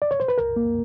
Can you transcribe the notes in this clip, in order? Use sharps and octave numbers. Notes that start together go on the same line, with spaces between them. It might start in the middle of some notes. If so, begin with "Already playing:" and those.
D5
C#5
C5
B4
C2 A#4
A#3